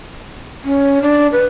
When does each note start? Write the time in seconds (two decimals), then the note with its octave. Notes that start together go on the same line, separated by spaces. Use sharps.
0.65 C#4
1.02 D4
1.32 B4